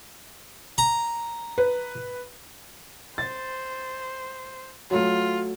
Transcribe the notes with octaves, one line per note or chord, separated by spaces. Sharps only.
A#5
B4
C5 A6
F#3 A3 F4